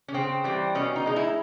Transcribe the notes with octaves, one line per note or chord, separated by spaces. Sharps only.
C#4
C#3 C4
E3 G3 C4
B2 C#4
D#4
G#3 D#4
E4